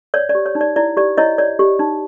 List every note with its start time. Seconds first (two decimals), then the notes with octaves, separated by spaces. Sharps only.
0.14 C#5 D5
0.29 D5
0.35 G4
0.46 C#5
0.55 D#4
0.61 D5
0.76 E4 D5
0.97 G4 D5
1.17 E4 C#5 D#5
1.38 C#5 D5
1.59 G4
1.79 D#4